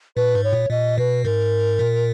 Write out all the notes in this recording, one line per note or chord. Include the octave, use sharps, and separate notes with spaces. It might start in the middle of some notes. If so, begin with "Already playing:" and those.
A#2 B4
G#2
C#5
A#2
A#2 D#5
B2 B4
G#2 A#4
A#2